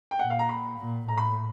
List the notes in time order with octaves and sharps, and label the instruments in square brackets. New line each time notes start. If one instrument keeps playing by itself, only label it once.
[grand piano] G5
[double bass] A#2 [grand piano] F#5
[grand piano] F5
A#5
B5
[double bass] A#2
[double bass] A2 [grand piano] A#5
[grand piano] B5